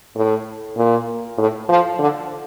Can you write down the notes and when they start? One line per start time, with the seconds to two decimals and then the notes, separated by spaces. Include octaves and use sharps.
0.16 A2
0.77 A#2
1.38 A2
1.69 F3
1.99 D3